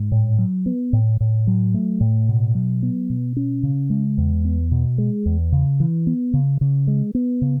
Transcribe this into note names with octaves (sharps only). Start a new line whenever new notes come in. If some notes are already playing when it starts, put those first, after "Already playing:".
Already playing: G#2
A2
F#3
B3
A2
A2
F#3
A3
A2
B2
F#3
B3
B2
C#4
C#3
G#3
E2
B3
B2
G#3
E2
C#3
E3
B3
C#3
C#3
G#3
B3
C#3